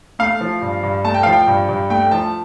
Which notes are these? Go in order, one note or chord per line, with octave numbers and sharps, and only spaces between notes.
A3 F5
F3
G2
G2
A3 A5
G5
F3 F5
G5
G2
G2
A3 G5
F3 A5